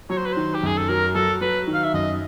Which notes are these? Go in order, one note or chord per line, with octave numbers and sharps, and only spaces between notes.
F#3 C#5
C5
B4
D#3 C5
G4
F#2 G#4
A4
F#3 A#4
F#3 A4
F#3 B4
D#3
F5
E5
F#2 D#5